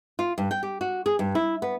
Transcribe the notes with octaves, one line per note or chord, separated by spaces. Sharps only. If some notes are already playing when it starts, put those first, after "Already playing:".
F4
G2
G5
G4
F#4
G#4
G2
E4
B3